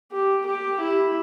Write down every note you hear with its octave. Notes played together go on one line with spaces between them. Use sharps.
G4
G4
E4